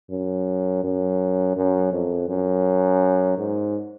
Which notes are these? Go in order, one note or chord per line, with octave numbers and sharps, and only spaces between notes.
F#2
F#2
F#2
F2
F#2
G#2